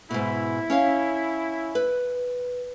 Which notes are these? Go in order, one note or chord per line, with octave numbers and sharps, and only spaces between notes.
G#2 B2 E4
C#4 C#5 F5
B4